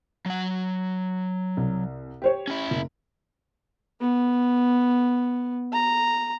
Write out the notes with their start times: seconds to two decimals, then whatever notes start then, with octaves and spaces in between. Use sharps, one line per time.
0.26 F#3 F#5
1.57 C2
2.22 G4 C5 C#5
2.47 C#4 E4
2.71 F#1
4.01 B3
5.73 A#5